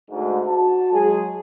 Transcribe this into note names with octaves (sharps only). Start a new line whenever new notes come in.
D2 G#2
F#4 A5
F#3 G#3 G#4